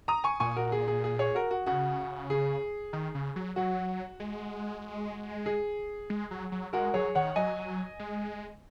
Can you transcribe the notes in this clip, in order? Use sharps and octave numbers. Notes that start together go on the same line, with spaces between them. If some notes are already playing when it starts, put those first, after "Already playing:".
A#5 D#6
G#5 C#6
A#2 G#5 C#6
F#4 A#4
G#4
G#4
G#4
G#4 C#5
F#4 A#4
F#4
C#3 F#4
G#4
D#3
C#3
F#3
F#3 F#4
G#3
G#4
G#3
F#3
F#3
G#3 F#4 A#4
F#3 G#4 C#5
D#3 C#5 F#5
F#3 D#5 G#5
G#3